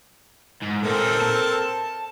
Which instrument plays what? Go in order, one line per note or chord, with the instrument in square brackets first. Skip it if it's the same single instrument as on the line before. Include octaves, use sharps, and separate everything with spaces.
[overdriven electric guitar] G#2
[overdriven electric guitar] A#2 D#4 [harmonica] C4 A4 A#4
[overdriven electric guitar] A5